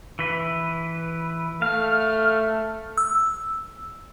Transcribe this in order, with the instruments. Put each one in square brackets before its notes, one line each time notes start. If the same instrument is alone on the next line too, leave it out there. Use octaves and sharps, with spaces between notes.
[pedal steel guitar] E3 B4
[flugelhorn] A3 [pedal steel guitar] F5 [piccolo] F6
[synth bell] E6